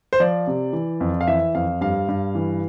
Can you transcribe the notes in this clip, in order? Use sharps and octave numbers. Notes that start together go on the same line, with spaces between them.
C5
F3 D5
C3
E3
F2
F5
E3 E5
F2 F5
G2 F5
G2
E3